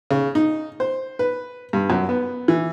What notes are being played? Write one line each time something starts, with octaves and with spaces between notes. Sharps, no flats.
C#3
D#4
C5
B4
G2
F#2
B3
E3